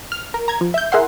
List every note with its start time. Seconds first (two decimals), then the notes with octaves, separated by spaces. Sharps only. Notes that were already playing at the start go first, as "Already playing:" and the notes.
0.12 F6
0.34 A#4
0.48 A#5 G#6
0.61 F3
0.74 E5 G6
0.92 E4 G#4 A#4 E5 F#5 C6